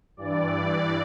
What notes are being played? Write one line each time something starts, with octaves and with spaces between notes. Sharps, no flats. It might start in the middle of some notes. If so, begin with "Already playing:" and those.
G2 E3 D5